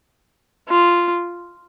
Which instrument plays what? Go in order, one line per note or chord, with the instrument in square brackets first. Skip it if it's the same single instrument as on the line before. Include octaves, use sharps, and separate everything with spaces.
[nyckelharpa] F4